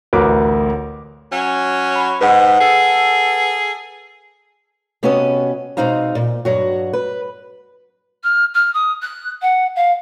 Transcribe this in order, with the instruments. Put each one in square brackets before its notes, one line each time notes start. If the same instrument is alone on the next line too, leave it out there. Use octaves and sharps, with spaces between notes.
[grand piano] A1 D2 A#4 B4 D6
[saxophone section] F#3 C#4
[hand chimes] B5
[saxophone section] G#2 [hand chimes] B4 F#5
[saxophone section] G#4 A4
[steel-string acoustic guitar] C3 B3 C#4 F#4 B4 D#5
B2 G#3 C4 D#4 F5 A#5
A#2
G2 F#3 F#4
B4
[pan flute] F6
F6
D#6
F#6
F#5
F5